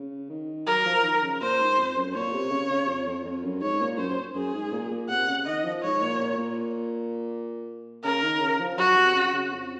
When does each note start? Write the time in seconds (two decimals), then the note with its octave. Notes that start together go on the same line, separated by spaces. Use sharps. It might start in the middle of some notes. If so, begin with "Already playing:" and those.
Already playing: C#3
0.30 D#3
0.67 F#3 A#4
0.86 F3
1.03 D#3
1.23 C#3
1.41 A#2 C5
1.60 G#2
1.77 F2
1.96 F#2
2.14 A#2 C#5
2.33 C3
2.51 C#3
2.70 C#3
2.88 F2
3.07 F2
3.25 F2
3.44 F#2
3.61 G#2 C#5
3.80 A#2
3.98 F#2 C5
4.35 F#2 G#4
4.54 G#2
4.72 A#2
4.91 A#2
5.09 C3 F#5
5.28 C#3
5.46 D#3 D#5
5.64 F3
5.82 G#2 C#5
6.01 A#2
6.19 A#2
6.38 A#2
8.04 C#3 A#4
8.23 D#3
8.41 C#3
8.60 F3
8.77 F#3 F#4
8.96 C3
9.14 C#3
9.33 C#3
9.51 F2